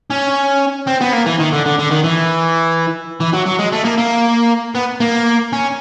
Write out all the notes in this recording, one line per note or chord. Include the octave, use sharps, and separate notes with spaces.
C#4
C4
B3
A#3
E3
D#3
D3
D3
D3
D#3
E3
E3
F#3
F#3
G#3
A3
A#3
A#3
B3
A#3
C#4